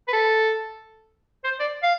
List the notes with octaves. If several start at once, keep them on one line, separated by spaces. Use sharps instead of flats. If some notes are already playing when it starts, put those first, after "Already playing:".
B4
A4
C5
D5
F5